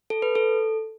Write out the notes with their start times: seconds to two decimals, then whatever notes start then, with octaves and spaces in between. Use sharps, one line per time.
0.10 A4
0.22 B4
0.35 A4